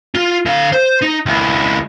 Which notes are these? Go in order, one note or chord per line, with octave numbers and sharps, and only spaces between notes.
F4
D3 F5
C5
D#4
C#2 E4